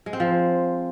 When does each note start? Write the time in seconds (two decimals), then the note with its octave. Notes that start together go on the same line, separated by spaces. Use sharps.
0.06 G#3
0.13 C4
0.20 F3